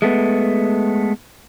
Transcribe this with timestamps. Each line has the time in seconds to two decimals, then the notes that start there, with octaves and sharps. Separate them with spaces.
0.02 G#3 A3 B3